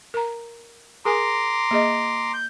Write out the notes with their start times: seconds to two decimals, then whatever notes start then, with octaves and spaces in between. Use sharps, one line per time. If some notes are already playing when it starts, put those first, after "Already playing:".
0.14 A#4 A#5
1.05 G#4 A#4 G#5 A#5 C6 D6
1.71 A#3 G#4 D#5
2.34 G6